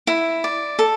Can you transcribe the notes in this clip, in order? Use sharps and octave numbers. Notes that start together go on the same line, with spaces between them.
E4
D5
A4